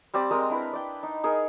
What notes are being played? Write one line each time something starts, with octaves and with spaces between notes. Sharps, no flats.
G3 C4 G4 D5
G#3 C4 A#4 D#5
D4 E4 B4
D5 G5
D#4
D#4 G#4 A#4